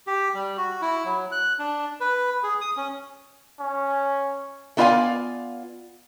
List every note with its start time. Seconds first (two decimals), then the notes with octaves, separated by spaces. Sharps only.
0.07 G4
0.35 G3
0.57 F#4
0.81 E4
1.05 F#3
1.32 F#6
1.59 D4
2.00 B4
2.43 G#4
2.61 D#6
2.77 C#4
3.60 C#4
4.77 A3 B3 F4 D5 F5 G#5